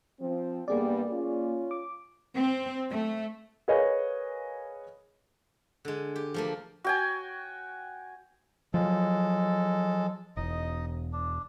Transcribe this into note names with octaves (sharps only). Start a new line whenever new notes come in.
F3 C4
G2 G3 A#3 B3 G#4 D5
C#4 F4
D6
C4
A3
G#4 A#4 B4 C#5 D#5 F5
D3 G#3
G4
F3 A3 A#3
F#4 G5 G#5
F3 F#3 G#3 A4
E1 D#4 D#5
D4